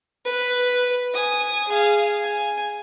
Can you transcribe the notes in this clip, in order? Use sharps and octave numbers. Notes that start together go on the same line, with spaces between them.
B4
G#5 D#6
G#4 F5
G#5